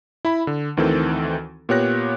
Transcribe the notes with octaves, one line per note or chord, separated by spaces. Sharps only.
E4 B5
D3
D2 D#3 E3 C4 A4
A#2 B3 G4 C#5 F#6 A#6